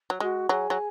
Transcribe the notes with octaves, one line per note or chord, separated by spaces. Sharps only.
F#3
G#3 F#4
F#3 G#4
F#3